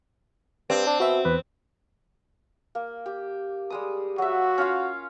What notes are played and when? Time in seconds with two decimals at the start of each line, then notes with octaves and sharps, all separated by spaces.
0.70 G2 C4
0.87 D4
1.00 B2 F#4 E5
1.25 E2 B4
2.75 A#3
3.06 G4
3.70 G3 G#3 D#6
4.18 F#3 F#4 E5
4.58 C#4 F4 F5